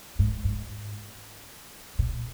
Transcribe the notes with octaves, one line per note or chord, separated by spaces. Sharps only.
G#2
G#2
A#2